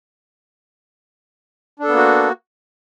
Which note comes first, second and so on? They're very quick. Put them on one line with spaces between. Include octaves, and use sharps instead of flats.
D4 A4 B3 A#3 F#4